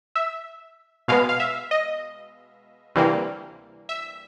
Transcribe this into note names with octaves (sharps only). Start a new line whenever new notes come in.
E5
B2 G#3 B3 F5
F5
E5
D#5
D2 C3 E3 G3 A#3
E5